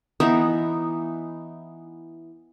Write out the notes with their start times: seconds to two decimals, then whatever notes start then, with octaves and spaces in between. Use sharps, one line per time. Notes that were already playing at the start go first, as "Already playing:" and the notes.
0.20 E3 B3 D#4 E5